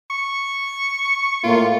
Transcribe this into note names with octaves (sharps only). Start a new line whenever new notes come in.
C#6
A2 A#3 F4